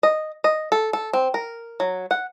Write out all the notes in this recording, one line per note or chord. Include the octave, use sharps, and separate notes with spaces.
D#5
D#5
A4
A4
C4
A#4
F#3
F#5